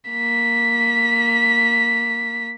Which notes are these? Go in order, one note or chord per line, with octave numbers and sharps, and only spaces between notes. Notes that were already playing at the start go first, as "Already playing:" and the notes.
A#3 B6